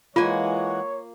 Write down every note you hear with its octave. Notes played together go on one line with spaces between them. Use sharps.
E3 G#3 A#3 F4 C#5 F#5 G#5